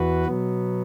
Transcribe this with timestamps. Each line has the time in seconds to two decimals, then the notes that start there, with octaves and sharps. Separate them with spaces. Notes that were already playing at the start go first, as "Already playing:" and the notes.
Already playing: E2 E3 F#4 B4
0.25 B2 F#3 B3